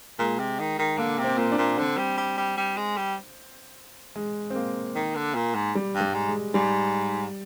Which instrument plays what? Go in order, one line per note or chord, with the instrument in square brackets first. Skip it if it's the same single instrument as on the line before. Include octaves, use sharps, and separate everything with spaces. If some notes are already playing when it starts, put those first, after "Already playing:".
[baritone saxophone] A#2 [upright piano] G#3
[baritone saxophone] C3
D#3
D#3
[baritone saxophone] D3 [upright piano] A#3
[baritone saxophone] C3
[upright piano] C4
[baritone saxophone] A#2
[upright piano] D4
[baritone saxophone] A#2
[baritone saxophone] D3 [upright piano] C4
[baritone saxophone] G3
G3
G3
G3
G#3
G3
[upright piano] G#3
C4
A#3
[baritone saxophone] D#3
D3
A#2
G#2
[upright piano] G3
[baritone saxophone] G2
[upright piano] G3
[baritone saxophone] G#2
[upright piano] G#3
[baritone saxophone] G#2 [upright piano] G3